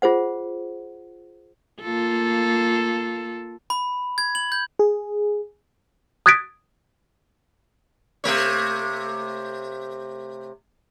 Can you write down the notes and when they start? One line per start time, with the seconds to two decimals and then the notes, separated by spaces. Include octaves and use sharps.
0.02 F4 G#4 C5 F#5
1.81 A#3 F4 A4
3.70 B5
4.18 G#6
4.35 F#7
4.52 G6
4.79 G#4
6.26 D#6 F#6 G#6 A6 B6 D7
8.24 C3 A3 C#5